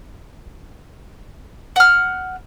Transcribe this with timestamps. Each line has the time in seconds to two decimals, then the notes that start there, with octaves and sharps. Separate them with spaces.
1.76 F#5 F6